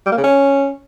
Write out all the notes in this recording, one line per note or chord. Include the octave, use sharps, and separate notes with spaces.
G3
A#3
C#3
C#4